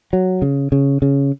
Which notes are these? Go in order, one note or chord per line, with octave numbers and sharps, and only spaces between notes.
F#3
C#3
C#3
C#3